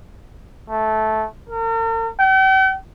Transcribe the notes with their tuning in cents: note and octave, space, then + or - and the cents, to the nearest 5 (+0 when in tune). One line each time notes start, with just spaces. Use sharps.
A3 -15
A#4 -45
G5 -45